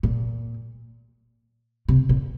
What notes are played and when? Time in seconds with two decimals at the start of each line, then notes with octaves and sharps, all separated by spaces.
0.03 A#2
1.88 C3
2.09 A#2